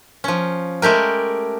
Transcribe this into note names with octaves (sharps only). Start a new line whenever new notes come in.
F3 C#4
G#3 A3 G4 A#4